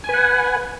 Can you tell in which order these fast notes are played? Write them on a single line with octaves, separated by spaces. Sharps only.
G#5 B4 F#5